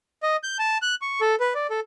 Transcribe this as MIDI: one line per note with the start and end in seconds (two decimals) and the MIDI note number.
0.23 0.37 75
0.43 0.57 91
0.59 0.78 81
0.82 0.95 90
1.02 1.21 85
1.21 1.35 69
1.40 1.53 71
1.55 1.67 74
1.70 1.80 69